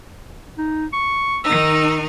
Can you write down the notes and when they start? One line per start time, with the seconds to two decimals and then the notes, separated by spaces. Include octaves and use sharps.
0.58 D#4
0.93 C#6
1.45 D#3 D#4 E6